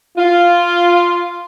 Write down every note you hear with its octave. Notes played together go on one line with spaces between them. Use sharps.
F4